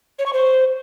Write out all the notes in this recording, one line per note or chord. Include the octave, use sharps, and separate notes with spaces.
C#5
C#6
C5